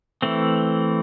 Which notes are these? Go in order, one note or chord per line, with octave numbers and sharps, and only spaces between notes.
E3 A3 C4